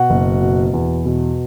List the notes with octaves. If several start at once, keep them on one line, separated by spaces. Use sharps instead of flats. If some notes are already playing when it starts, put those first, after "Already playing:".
Already playing: B2 F#4 F#5
F#1
B2
E2
B2